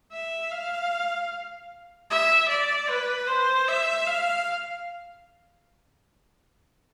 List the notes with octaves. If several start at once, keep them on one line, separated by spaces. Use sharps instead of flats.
E5
F5
E5
D5
B4
C5
E5
F5